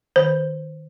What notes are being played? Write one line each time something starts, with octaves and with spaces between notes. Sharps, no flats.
D#3 C5